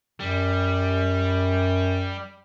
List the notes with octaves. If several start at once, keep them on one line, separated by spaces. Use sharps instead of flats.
F#2 G3